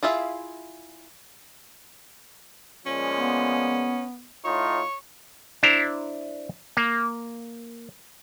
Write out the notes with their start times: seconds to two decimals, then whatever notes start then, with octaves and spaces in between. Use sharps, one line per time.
0.03 E4 F4 G#4 E5 F5
2.86 A#2 F3 G#3 C#4
3.17 B3
4.45 A2 D#4 F4 C#5
5.63 D4 E4 C5 A#5
6.77 A#3